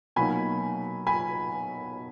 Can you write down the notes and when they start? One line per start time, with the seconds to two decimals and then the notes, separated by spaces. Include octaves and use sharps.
0.16 B2 F#3 A#3 D#4 G#5 B5
1.07 G#5 B5